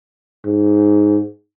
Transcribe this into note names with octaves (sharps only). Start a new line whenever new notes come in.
G#2